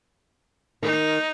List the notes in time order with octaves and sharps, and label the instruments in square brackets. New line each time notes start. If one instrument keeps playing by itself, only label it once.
[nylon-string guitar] D#3 [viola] D#4